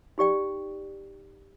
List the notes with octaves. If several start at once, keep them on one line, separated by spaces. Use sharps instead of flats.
D#4 G4 D5 G5